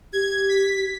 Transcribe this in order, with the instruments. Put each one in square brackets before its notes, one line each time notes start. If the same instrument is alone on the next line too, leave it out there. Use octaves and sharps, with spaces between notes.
[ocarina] G4 [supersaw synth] G#6
[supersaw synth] B6